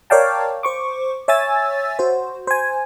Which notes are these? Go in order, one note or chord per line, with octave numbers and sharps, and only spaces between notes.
A#4 C#5 D5 F5 G5 A5
C5 C#6 D6
C#5 E5 G#5 E6 A6
F#4 C5
C5 G#5